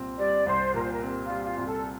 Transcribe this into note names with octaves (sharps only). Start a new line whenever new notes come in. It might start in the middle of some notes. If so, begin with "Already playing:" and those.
Already playing: C2 A#2 C4
G3 D5
C2 C5
A#2 A#4
C5
A#4
C4
F4
G3
F4
C2
A4